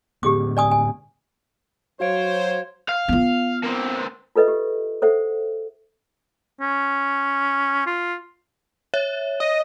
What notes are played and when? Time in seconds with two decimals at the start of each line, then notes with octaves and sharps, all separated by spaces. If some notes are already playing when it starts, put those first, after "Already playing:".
0.23 A2 D3 B3 G4 G#4 D6
0.57 D5 G#5 D#6
0.71 G#5
2.00 F#3 F#4 C5 C#5 F5 D7
2.89 F5
3.08 B3 F4
3.63 A#3 C4
4.36 F4 A4 B4 D#5 E5
4.48 G4
5.02 A4 C5 E5 F#5
6.61 C#4
7.86 F4
8.94 C#5 E5
9.40 D#5